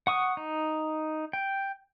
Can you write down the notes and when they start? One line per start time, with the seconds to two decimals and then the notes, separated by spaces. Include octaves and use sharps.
0.07 F#5 C#6 D#6
0.37 D#4
1.33 G5